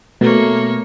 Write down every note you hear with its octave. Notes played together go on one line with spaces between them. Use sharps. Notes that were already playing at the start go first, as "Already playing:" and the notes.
B2 A3 A#3 C#5